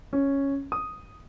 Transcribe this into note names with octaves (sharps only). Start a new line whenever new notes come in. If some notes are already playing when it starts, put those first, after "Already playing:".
C#4
D#6